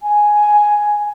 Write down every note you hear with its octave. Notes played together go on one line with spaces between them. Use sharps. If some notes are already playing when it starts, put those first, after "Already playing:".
G#5